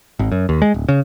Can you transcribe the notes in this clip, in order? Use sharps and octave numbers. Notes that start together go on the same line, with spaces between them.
G#1
F#2
D#2
G#3
D1
C#3